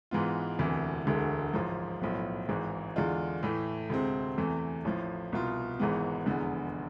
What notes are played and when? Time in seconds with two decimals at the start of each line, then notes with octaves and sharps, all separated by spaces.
0.11 G#2 E3 G#3 B3 F4
0.59 E1 D2 C3 E3
1.07 E1 D2 D3 G#3
1.54 A1 G#2 F3
2.02 B1 A2 F3 B3
2.49 G#1 G#2 E3 G#3
2.96 E2 D3 G#3 D4 F4
3.43 A2 E3 A3
3.90 D2 C3 G#3 C4
4.37 E2 C3 E3 A3
4.85 A1 A2 F3
5.32 C2 B2 B3 F4
5.80 G#1 G#2 E3 G#3 B3
6.26 F1 E2 D3 G#3 B3